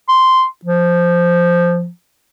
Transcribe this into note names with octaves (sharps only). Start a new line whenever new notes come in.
C6
F3